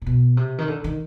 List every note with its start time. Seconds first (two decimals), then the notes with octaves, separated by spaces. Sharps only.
0.02 A#2
0.06 B2
0.37 C3
0.58 D#3
0.68 D3
0.84 D#3